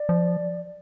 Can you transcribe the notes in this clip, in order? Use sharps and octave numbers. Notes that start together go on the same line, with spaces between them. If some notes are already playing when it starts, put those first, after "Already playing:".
Already playing: D5
F3